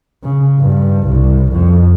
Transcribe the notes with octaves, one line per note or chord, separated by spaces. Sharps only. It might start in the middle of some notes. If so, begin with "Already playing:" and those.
C#3
G2
C2
F2